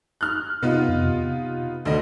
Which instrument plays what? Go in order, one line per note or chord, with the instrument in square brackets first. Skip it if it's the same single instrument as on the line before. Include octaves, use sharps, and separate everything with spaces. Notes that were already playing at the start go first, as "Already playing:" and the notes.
[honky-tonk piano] F6 F#6
[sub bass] C3 [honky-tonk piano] B3 D#4 F4
[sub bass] F2
C3
[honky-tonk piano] D2 D3 D#5